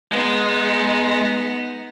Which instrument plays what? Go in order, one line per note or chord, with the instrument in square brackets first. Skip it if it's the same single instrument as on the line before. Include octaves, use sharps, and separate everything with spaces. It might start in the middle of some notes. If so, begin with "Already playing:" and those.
[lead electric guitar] G#3 [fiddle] B3 D#4